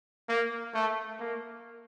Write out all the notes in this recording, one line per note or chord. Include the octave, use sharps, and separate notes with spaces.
A#3
A3
A#3